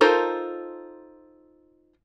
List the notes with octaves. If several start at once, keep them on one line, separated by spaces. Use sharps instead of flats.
D#4 F4 A4 A#4 C5